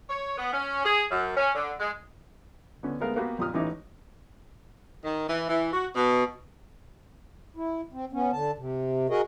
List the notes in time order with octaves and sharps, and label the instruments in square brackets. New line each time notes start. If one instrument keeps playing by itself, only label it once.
[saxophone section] C#5
B3
C#4
G#4
F#2
C#4
D3
G#3
[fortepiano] D3 B3 C#4
G#3 A3 B3 A#4 F5
A#3 B3 F#4 G4 B4
F2 A#2 G4 D#6 F6
A1 E3 C#4 D#4 D6
[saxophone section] D#3
E3
E3
F#4
B2
[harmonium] E4
C4
B3 C#4
D3 A5
C3
F#4 G#4 A#4 D#5